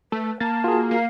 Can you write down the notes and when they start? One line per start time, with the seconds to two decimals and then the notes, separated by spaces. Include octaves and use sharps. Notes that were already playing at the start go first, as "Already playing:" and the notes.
0.12 A3 B4
0.40 A#3 A5 A6
0.64 F4 F#4 G#4
0.91 A#3 F5